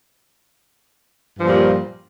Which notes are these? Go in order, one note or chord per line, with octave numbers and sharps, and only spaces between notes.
G2 A#2 F3 G3